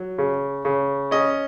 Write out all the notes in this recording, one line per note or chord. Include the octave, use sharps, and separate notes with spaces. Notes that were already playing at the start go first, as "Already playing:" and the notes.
Already playing: F#3
C#3
C#3
C#4 D#5